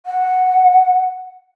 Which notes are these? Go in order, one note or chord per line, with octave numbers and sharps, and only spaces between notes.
F#5